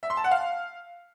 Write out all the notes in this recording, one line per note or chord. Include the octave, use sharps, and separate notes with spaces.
E5
C6
A5
F#5
F5